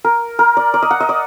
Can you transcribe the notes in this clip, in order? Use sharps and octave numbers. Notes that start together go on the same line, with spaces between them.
A#4
A#4
D5
D5
D#5
F#5
D#5
D5